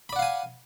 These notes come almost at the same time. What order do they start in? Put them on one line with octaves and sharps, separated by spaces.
B5 D5 F#5 F5 G#5